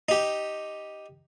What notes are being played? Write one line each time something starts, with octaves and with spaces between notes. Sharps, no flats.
D#4 G4